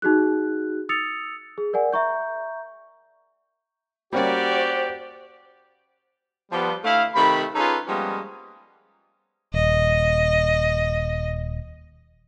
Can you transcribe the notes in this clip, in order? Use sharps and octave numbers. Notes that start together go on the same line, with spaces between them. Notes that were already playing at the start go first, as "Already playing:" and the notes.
D#4 F#4 G#4 F#6
D#6 E6 A6 C#7 F7
G#4
A#4 D5 F#5 G#5
E5 A#5 C#6 G6
G3 A#3 C#4 F#4 G4 C5 D5
F3 G3 B3
D3 A3 E4 F5
C3 D#3 A3 B5
C#4 D#4 F4 G#4 A4 B4
F3 G3 G#3 A#3 B3 C#4
D#1 D#5